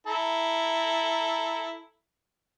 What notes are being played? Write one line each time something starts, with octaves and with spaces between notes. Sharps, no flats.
E4 A4 A#5